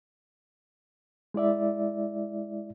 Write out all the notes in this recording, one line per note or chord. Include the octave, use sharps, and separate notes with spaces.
G#3 E4 D5 E5